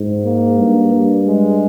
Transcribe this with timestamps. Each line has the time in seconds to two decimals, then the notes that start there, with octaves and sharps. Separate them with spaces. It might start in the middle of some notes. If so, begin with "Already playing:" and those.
Already playing: G#2
0.25 A#3
0.59 G2
0.93 G2
1.27 G#3